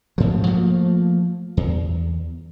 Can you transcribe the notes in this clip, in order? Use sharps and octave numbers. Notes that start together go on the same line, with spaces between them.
A1 G#2 F3
F3 A3 A#3
E2